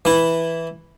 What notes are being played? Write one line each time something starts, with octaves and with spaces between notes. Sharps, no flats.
E3 E4